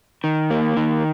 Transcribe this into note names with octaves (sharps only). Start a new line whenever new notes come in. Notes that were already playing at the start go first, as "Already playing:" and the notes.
D#3
A#3
D#3